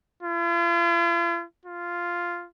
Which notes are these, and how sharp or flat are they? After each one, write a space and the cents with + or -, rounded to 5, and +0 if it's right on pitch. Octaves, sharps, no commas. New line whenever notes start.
F4 -45
F4 -5